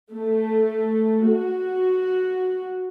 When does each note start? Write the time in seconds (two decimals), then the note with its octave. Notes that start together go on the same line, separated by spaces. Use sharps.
0.13 A3
1.29 F#4